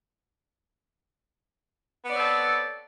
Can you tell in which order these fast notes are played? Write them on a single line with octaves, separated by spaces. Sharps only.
B3 D5 C#5 C4 A4